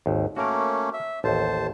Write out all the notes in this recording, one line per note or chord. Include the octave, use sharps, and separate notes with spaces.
G#1 D#2
A3 A#3 C#4 F#4 A#4
E5
A1 D#2 C5 A5